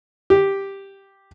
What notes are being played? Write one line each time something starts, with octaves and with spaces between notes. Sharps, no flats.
G4